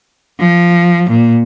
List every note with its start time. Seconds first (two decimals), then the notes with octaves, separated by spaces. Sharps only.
0.40 F3
1.10 A#2